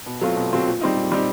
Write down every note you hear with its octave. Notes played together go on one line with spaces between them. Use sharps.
B2
F#3 A3 C4 F4
B2
F#3 A3 C4 F4
A#2
G3 C4 D#4
A#2
G3 C4 D#4